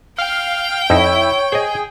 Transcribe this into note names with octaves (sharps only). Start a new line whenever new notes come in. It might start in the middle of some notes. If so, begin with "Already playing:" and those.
F5 G5
F2 D#4 E4 C#5
G#4 C5 D#5